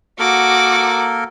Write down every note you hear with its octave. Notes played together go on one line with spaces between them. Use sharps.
A#3 F#4 A4 A#4 D6